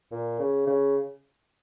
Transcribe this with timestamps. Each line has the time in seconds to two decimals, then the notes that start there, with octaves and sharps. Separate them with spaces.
0.11 A#2
0.39 C#3
0.67 C#3